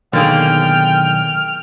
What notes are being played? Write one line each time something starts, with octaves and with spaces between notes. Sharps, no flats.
B1 D3 D#3 A#3 G#4 G5 F6